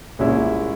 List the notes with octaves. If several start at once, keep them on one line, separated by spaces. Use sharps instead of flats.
C2 A#2 G#3 C#4 E4